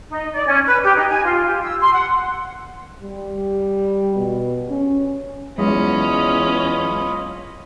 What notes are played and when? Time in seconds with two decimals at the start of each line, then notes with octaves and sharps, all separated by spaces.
0.10 D#4
0.33 D5
0.46 C#4
0.66 B4
0.84 G4
0.96 D#4
1.09 G#5
1.24 F4
1.46 G4
1.62 E6
1.80 C6
1.92 F#5
3.02 G3
4.16 B2
4.70 C#4
5.58 E2 F#3 G#3 C#4 F4 D#5 B5